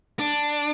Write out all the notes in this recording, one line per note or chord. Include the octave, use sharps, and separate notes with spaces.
D4